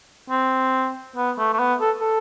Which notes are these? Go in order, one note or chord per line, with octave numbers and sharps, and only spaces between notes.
C4
B3
A3
A3
B3
A4
A4